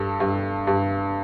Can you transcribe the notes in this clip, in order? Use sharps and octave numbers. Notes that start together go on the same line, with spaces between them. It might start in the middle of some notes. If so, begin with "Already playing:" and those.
Already playing: G2 A4
G2
G2